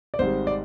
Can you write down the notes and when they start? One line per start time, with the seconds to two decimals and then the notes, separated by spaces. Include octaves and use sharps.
0.14 D5
0.19 G#1 G#2 G3 C5
0.47 D5